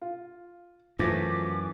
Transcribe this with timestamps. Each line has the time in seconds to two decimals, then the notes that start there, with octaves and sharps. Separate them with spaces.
0.02 F4
0.99 F#2 E3 F3 A3 D6